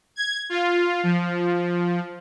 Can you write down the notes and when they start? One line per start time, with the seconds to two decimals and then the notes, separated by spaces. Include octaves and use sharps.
0.16 G#6
0.50 F4
1.03 F3